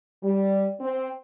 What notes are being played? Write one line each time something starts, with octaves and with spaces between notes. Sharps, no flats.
G3
C4